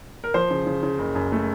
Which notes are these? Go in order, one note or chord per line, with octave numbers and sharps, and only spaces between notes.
A#4
F3 C5
C#3
C#3
C#3
F#1
F#2
A3